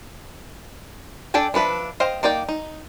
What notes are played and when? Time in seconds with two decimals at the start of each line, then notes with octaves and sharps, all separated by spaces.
1.34 D4 A4 G5 G#5
1.54 F3 D4 B4 E5
2.00 C5 D#5 F5 G5
2.23 A#3 D#4 D5 G5
2.49 D#4